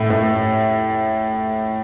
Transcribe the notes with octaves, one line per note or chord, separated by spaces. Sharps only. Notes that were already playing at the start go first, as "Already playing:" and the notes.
Already playing: A2
A2